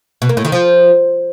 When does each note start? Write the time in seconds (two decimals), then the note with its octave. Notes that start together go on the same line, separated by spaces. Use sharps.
0.22 B2
0.29 A#3
0.37 A2
0.45 D#3
0.52 F3